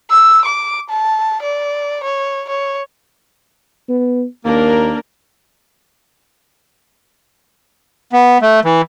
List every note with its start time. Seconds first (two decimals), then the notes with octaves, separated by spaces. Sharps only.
0.10 E6
0.45 D6
0.90 A5
1.42 D5
2.04 C#5
2.49 C#5
3.89 B3
4.45 D#2 A#3 D4 A#4
8.13 B3
8.42 A3
8.65 E3